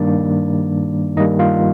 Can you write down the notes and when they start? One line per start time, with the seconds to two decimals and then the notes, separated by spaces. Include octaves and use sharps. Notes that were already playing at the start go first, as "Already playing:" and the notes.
Already playing: G2 D#3 G3 A#3 D4 D5
1.16 G2 D#3 G3 A#3 D#4 D#5
1.39 F4 F5